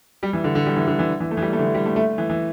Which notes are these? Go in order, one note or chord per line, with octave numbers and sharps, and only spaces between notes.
G3
E3
D3
D3
G3
E3
D3
E3
E3
A3
E3
G3
A3
D3
E3
G3
A3
A3
E3
E3